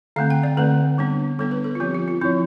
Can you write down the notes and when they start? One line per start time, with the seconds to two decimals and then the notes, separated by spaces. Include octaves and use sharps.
0.16 D3 A3 C4 F5
0.30 G5
0.43 D5
0.57 D3 A3 C4 B4
0.98 G3 B3 D4
1.39 G3 B3 D4 A4
1.51 B4
1.64 A4
1.75 F4
1.80 F3 C4 G4
1.94 F4
2.08 F4
2.21 F3 C4 E4